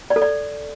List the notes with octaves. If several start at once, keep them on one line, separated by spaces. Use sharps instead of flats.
D5
A4
D5